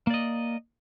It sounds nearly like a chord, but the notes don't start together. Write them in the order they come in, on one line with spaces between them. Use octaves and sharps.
A#3 D5 D#5